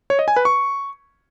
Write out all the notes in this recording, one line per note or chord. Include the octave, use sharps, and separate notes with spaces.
C#5
D#5
G#5
B4
C#6